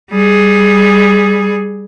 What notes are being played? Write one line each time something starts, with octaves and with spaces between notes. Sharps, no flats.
G3 G#4